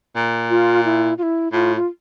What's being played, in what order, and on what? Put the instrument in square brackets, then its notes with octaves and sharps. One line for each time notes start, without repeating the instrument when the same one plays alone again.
[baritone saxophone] A#2
[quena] F4
E4
F4
E4
[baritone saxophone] A2 [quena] F4
[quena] F4